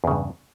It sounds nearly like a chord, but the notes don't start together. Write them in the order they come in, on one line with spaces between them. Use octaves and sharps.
E2 C#3 G2